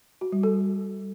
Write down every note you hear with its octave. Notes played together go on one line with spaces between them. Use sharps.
F#4
G3
A4